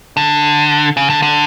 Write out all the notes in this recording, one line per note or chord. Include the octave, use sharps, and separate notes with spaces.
D3
C#3
D3
D3